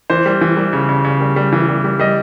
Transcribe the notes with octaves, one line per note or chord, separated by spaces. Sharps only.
E3 C5
G3
E3
G3
C#3
C#3
C#3
G3
G3
E3
G3
G3
G3 D#5